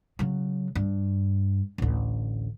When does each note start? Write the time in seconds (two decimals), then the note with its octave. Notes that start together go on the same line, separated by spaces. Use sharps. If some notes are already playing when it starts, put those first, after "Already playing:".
0.19 C#3 F#3
0.75 G2
1.78 A1 D2